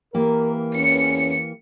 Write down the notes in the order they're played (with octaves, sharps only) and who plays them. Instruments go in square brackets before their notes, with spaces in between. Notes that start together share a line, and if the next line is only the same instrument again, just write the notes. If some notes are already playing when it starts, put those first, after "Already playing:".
[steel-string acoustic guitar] E3 A#3 G4 [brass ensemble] A#4
[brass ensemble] E2 C#4 [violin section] C#7